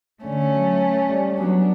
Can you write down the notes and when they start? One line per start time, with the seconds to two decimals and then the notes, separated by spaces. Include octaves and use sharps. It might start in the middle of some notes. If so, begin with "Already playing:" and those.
0.24 D3 A3 C#4
0.52 F#3
1.09 G3
1.38 F#3 B3 D4